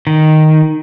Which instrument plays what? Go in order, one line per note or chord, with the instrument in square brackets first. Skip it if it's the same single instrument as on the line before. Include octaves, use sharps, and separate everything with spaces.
[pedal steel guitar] D#3